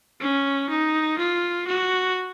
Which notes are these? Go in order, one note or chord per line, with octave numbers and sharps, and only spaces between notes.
C#4
D#4
F4
F#4